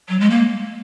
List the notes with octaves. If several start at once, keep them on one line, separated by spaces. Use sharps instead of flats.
F#3
G#3
A#3